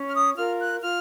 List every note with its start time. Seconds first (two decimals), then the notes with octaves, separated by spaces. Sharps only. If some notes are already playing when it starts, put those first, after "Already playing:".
Already playing: C#4
0.08 F6
0.14 D#6
0.36 F4 A#4 F6
0.59 F#6
0.81 F4 F6